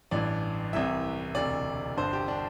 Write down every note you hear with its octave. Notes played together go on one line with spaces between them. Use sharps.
A1 G2 E3 D5
C2 C3 E3 E5
E1 D2 C3 D5
G1 G2 D3 C5
G4
D4